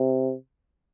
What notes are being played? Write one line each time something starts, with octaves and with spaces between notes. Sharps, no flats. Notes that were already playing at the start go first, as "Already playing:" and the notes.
Already playing: C3